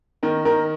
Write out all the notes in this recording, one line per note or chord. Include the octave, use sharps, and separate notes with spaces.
D#3 A#4
D#3 A#4